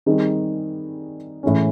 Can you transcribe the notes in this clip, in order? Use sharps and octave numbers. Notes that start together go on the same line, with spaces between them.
D#3 G3 C4 D#4 G#4
A2 E3 G#3 C#4